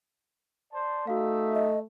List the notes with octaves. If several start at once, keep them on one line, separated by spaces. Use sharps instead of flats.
C5 D5 A5
A3 D#4 F#4 E5 F5
D#5